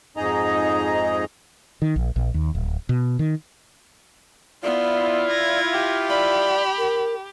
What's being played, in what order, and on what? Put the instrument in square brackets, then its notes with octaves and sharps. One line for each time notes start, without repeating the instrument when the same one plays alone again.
[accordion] F2 G#2 D#4 G#4 D#5 A#5
[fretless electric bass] D#3
A#1
A#1
D#2
D1
B2
D#3
[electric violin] B3 C5 [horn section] E4 F4 [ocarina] D5
[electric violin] G#6 A#6
[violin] G4
[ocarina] D5 [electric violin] B5
[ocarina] A#4